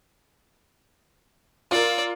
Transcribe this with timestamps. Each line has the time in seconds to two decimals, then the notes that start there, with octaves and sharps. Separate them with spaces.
1.71 F4 A#4 D5 E6